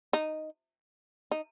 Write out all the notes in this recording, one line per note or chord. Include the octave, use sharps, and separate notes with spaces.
D#4
D#4